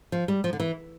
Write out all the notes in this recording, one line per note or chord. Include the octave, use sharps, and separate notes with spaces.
F3
G3
F3
D3
E3